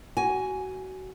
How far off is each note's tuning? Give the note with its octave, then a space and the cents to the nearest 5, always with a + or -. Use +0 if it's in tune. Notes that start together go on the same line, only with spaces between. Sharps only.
F#4 +25 G#5 +5